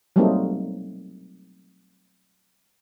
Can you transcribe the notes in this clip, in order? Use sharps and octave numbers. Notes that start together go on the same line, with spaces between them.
F#3 G3 A3 A#3 C4 D#4